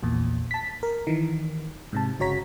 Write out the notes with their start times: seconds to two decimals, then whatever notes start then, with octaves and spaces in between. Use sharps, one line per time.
0.03 A#1 E2 A#2
0.51 A5 B6
0.83 A#4
1.07 D#3 E3
1.93 G#2 C3 A5
2.20 G1 C#3 F#4 C#5 A#5 B6